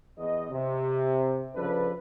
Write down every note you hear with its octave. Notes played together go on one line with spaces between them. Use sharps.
E2 D#5
C3
C#3 F3 D4 A4 B4